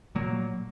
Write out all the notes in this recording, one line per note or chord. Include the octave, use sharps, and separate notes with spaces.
A#2 F#3 A#3